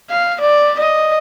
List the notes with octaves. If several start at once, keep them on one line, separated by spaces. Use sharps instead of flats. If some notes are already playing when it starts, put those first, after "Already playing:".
F5
D5
D#5